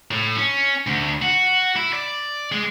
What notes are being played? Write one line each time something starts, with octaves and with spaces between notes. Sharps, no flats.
A2
C#4
D2
F#4
E4
D5
G#3